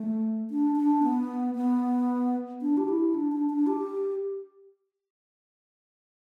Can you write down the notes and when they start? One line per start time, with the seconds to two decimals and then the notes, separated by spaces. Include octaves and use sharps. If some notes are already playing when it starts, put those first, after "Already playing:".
Already playing: A3
0.50 D4
0.76 D4
1.03 B3
1.55 B3
2.62 D4
2.77 G4
2.88 E4
3.14 D4
3.32 D4
3.50 D4
3.67 G4